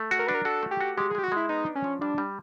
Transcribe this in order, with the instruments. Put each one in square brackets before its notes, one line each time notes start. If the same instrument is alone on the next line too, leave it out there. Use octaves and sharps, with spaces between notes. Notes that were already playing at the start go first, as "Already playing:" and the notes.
Already playing: [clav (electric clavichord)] A3
F#4
[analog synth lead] A#4
[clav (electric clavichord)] D4 [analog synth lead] B4
[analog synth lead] A#4
[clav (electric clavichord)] F#4 [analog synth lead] A4
[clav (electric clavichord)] A3
[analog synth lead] G4
[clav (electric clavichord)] F#4
[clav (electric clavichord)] G#3 [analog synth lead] G4
[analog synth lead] G#4
[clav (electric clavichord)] G#3 [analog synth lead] G4
[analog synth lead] F#4
[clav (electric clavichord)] G#3 [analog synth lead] E4
[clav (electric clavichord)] B3 [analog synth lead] D#4
[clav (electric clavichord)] D4
[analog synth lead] C#4
[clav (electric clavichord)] F3
[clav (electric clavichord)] G3 [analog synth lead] D4
[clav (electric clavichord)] G3